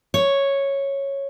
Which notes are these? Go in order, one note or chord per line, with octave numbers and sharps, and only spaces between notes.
C#5